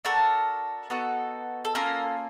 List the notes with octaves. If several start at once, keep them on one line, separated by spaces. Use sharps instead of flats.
D4 F#4 A4 A#4
B3 D#4 F#4 A4
A4
A#3 C#4 F4 A4 A#4